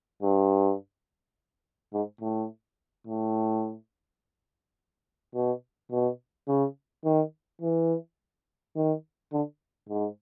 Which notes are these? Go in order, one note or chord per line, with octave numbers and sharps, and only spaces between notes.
G2
G#2
A2
A2
B2
B2
C#3
D#3
E3
D#3
D3
G#2